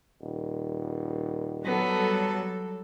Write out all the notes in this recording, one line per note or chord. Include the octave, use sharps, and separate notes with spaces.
D#1
F#3 G3 B3 A4